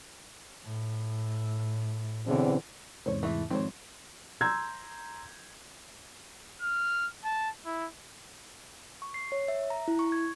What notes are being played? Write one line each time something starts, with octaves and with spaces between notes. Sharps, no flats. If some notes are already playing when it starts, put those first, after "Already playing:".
A2
E2 B2 D3 C4 C#4
E2 G#2 C3 C5 C#5
E3 A3 G#4 E5
F2 G#2 D#3 C4 C5 C#5
A#5 C6 E6 G6 G#6
F6
A5
E4
C#6
C7
C#5
E5
A#5
E4
C#6
G#6